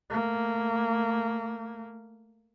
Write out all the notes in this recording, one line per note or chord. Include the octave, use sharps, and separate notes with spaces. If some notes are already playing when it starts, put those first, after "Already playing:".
A3 A#3